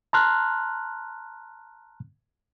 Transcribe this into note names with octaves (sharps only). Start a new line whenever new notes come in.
A5 A#5 C6 F6 F#6